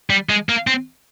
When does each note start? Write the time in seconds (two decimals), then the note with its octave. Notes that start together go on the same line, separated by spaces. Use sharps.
0.10 G3
0.29 G#3
0.49 A#3
0.67 C4